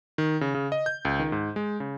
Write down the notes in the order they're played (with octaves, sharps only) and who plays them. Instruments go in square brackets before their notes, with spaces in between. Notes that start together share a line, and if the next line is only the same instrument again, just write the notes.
[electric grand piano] D#3
C#3
C#3
D#5
G6
C#2
D#3
G#2
G#3
C#3